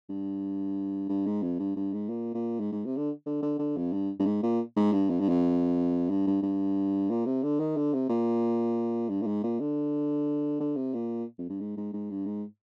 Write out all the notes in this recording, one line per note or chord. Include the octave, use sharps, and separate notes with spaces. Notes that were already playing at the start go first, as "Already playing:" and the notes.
G2
G2
G#2
F2
G2
G2
G#2
A#2
A#2
G#2
G#2
C3
D3
D3
D3
D3
F2
G2
G2
G#2
A#2
G#2
G2
F2
G2
F2
G2
G2
G2
A#2
C3
D3
D#3
D3
C3
A#2
G2
A#2
G#2
A#2
D3
D3
C3
A#2
F2
G2
G#2
G#2
G#2
G2
G#2